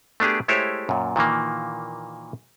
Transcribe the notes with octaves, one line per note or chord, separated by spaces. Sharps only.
A3 B3 D4 G4 G#4
G#3 A3 E4 G4 C5 C#5
F#2 A#2
A#2 D#3 E3 A#3